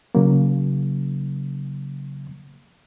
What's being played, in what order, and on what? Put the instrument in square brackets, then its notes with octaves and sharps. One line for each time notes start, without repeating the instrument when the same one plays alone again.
[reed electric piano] C#3 F#3 A#3